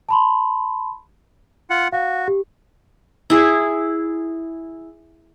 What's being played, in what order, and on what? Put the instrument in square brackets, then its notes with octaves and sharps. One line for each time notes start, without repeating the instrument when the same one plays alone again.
[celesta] A5 B5 C6
[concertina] F4 F#5
[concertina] F#4 [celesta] F5
[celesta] G4
[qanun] E4 G#4